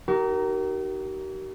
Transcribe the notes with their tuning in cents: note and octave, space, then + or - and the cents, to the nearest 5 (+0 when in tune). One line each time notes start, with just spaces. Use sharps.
D#4 +5 G4 -45 A#4 +0